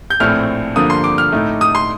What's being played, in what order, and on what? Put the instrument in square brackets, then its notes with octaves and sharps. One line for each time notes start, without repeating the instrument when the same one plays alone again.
[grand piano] G6
A#1 A2 A3 C4 F6
G2 D3 F3 A#3 D#6
C6
D6
F6
A2 A3 D#4
D#6
C6